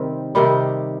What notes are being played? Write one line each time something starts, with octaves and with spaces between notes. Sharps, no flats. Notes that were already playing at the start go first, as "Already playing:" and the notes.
Already playing: C3 D#3 G3 C4
C3 D#3 G3